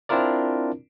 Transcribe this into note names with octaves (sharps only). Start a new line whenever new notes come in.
C4 D4 E4 F4 A#4 D5